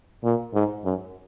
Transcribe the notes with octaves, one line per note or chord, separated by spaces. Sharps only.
A#2
G#2
F#2